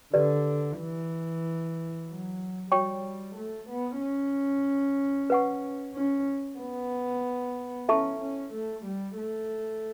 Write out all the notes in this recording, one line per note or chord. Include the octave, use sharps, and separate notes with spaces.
D3 G4 B4 D5
E3
F#3
G3 F#4 C#5 G5 C#6
A3
B3
C#4
B4 F#5 C#6
C#4
B3
C#4 E4 A4 E5 A5 C#6
C#4
A3
G3
A3